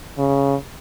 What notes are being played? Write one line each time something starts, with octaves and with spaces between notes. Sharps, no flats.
C#3